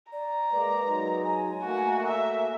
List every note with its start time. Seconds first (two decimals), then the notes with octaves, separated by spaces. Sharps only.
0.12 D5 A#5
0.52 G#3 A#3 B4 D5
0.85 F#3 G#3 D#4
1.24 G#5
1.62 A3 A#3 F#4
2.07 E5